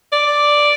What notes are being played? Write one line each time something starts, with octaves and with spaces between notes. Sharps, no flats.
D5